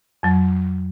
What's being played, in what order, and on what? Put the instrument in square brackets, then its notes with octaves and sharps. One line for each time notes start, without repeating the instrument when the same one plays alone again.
[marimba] F2 F#3